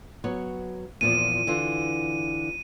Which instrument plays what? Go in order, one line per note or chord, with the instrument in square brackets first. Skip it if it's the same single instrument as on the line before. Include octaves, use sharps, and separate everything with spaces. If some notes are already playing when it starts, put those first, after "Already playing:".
[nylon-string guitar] F#3 B3 C#5
[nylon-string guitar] E2 A#2 F3 [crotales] D#7
[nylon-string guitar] D3 E3 F4